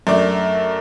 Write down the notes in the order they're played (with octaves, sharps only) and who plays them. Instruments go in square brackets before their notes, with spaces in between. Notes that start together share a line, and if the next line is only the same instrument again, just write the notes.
[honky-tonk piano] F#2 A3 D4 D6